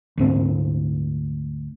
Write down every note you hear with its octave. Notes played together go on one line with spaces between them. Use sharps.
D2 G#2 C4